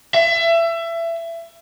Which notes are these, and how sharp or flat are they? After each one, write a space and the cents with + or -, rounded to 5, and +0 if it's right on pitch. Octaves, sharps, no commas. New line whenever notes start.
E5 +25